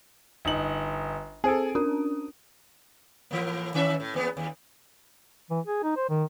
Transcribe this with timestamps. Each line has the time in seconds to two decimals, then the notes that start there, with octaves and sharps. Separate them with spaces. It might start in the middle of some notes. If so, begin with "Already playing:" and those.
0.45 G1 D#4 F#7
1.44 C4 G#4 A4 C5 D7
1.75 C#4 D4 A#4 D#6
3.31 A2 E3 A#3
3.74 D#3 C#4 E5
4.00 A2
4.14 E2 A#3 B3
4.37 D#2
5.50 E3
5.67 G#4
5.83 D#4
5.96 C5
6.09 D#3